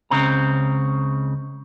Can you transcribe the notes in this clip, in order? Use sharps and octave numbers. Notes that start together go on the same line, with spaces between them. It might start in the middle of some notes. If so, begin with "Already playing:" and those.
C#2 C#3 C4 A#5